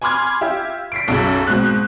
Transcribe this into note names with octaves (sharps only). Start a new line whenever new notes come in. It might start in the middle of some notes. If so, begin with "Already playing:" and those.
G#5 B5 C6 D6 F6 G#6
F4 G4 E5
B6 C7 D7
B1 F#2 C#3
G#2 B2 C4 F#6